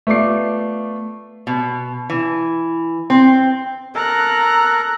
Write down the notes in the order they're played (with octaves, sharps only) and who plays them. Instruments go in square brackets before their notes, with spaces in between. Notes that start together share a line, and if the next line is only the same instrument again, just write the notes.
[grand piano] A3 B3 F4 D5 D6 C7
[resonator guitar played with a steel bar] B2
E3
C4
[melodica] A4 A#4 [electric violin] A#5 F#6